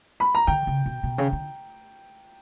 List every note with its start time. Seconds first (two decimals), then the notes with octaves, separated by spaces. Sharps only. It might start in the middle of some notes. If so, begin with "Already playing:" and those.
0.20 B5
0.35 A#5
0.47 D3 G5
0.67 C#3
0.86 B2
1.03 B2
1.18 C#3
1.33 D3